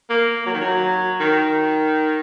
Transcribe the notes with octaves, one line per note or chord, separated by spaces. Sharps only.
A#3
F#3
D#3
F#3
D#3